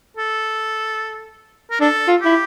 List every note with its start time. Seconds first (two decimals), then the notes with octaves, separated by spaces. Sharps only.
0.17 A4
1.71 A#4
1.81 D4 A4
2.08 F4
2.21 E4 G4